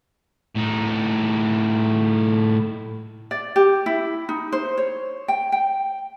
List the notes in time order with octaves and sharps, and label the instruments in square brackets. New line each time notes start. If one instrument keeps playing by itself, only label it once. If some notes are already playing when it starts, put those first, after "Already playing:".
[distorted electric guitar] A2 D#4
[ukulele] D5
G4
E4
D#4
C5
C#5
G5
G5